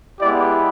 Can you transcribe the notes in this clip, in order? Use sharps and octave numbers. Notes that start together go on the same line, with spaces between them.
G#3 B3 E4 G4 D5